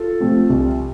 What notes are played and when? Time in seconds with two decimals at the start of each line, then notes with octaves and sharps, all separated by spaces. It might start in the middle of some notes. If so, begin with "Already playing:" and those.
Already playing: F4 A4
0.21 C3 F3 A3 C4
0.50 C2